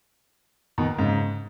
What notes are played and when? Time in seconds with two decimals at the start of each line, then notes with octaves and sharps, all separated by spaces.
0.78 B2 D#3
0.99 G#2 C#3